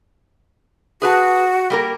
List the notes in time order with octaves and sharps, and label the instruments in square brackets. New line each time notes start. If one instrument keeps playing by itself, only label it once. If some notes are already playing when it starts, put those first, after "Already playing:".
[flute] F#4 [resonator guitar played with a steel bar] G#4 B4 A5
[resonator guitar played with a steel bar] G3 A#3 A#4